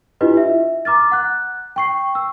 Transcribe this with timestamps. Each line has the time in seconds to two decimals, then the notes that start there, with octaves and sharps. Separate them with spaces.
0.21 D4 E4 F4 G4 B4 D#5
0.37 E5
0.85 A#5 D6 F6 A6
1.11 F#5 F#6
1.76 G5 C#6 C7
2.15 E6